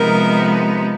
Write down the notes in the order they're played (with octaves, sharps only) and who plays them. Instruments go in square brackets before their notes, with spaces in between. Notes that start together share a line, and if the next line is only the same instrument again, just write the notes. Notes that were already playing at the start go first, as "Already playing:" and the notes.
Already playing: [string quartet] C3 F3 G#3 B3 D#4 A#4